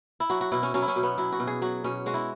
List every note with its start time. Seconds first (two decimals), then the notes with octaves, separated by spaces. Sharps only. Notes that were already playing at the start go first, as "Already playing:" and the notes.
0.20 E4
0.30 F#3 F#4
0.41 F#4
0.52 B2 E4
0.63 C#4
0.74 F#3 C#4
0.82 E4
0.88 C#4
0.96 B2
1.03 B3
1.18 F#3 E4
1.32 F#4
1.40 B2
1.47 G#4
1.62 F#3 F#4
1.84 B2 C#4
2.06 G#3 F#4
2.14 E4